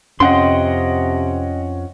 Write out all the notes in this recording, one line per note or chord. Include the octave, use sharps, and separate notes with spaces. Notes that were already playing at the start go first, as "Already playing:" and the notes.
F2 C3 C#4 D#5 F#5 G5 C6